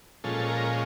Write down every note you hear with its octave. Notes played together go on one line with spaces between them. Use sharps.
A#2 F3 G#3 C#4 A4
A#4